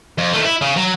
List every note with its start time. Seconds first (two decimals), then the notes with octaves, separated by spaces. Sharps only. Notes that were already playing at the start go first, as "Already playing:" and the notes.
0.18 F2
0.33 D#3 A3
0.45 E4
0.61 C#3
0.76 F#3